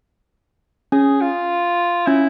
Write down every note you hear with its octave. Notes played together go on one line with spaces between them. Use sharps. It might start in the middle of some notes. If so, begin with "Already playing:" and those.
C#4 G#4
F4
C#4 E4